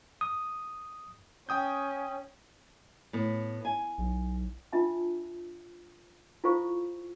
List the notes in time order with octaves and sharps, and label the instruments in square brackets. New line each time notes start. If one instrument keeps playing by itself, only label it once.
[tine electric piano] D#6
[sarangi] C#4 [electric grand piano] G5 D#6 G6
[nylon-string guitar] A2 B3
G#5
[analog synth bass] B1
[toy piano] D4 F4 E5 A5
E4 F4 A4 C5 F5 C#6